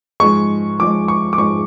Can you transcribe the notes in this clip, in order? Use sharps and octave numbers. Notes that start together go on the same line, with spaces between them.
G#2 F3 G#3 C#6
G#2 F3 G#3 D6
C#6
D6
G#2 F3 G#3 C#6